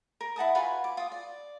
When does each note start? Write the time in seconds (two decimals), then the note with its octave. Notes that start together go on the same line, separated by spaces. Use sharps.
0.21 A#4
0.36 E4 F#5 A5 D#6
0.55 F4 F#4 B4 G#5
0.84 D6
0.97 F4 D#6
1.12 D5